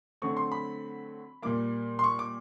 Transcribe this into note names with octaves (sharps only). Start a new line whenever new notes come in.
D3 F#3 A3 C4 C#6
C6
B5
A#2 G3 A#3 D6
C6
C#6
D6